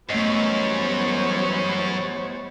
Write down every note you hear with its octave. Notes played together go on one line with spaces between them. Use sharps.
F#2 E3 G3 A3 B3 C5 C#5 D#5